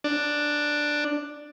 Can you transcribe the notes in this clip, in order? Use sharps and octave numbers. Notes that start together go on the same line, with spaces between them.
D4